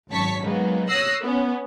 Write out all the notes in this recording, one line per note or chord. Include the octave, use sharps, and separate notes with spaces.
G#1 F#2 C#5 A5 C#6 B6
F#3 G#3 A#3 B3 D#4
C#5 D#6 E6 F#6 A#6 C7
B3 C#4